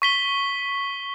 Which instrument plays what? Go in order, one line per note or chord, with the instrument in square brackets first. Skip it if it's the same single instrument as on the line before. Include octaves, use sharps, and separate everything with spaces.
[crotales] C#6 B6 G7